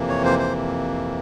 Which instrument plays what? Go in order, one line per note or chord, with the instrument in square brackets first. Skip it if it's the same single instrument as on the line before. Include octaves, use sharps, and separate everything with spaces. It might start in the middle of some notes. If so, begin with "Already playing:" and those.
Already playing: [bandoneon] F2 C3 E3 A#3
C#5
C5
C5